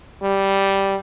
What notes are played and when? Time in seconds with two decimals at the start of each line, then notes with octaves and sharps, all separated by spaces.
0.23 G3